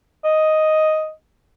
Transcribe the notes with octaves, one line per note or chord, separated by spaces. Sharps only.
D#5